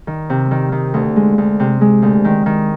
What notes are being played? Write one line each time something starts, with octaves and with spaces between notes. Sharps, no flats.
D#3
C3
D#3
D#3
D2
G#3
D2
C3
G#3
D2
D#3
D#3